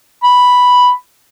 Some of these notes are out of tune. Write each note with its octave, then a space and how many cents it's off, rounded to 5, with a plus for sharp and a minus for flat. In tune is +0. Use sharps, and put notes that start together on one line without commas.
B5 +0